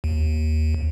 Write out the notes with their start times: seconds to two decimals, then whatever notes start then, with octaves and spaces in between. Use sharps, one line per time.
0.04 D#2